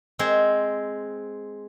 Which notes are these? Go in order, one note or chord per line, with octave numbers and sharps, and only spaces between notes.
G#3 C4